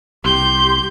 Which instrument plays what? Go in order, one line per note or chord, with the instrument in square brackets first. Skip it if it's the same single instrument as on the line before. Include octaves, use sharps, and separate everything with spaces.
[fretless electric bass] C2 [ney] G4 [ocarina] C6 [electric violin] G6